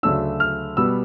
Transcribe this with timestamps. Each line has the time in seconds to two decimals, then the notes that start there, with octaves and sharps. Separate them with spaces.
0.03 D2 C#3 F#3 A3 D4 E6
0.40 F6
0.77 B2 G3 B3 E6